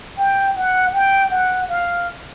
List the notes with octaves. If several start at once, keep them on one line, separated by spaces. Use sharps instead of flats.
G5
F#5
G5
F#5
F5